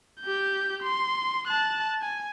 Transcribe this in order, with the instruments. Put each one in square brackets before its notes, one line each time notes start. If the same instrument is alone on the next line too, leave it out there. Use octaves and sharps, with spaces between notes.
[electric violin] G4 G6
C6
A5 F#6
G#5